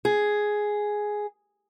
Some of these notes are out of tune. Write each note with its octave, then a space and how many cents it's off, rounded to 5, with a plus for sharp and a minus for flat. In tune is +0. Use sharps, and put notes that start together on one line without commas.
G#4 +5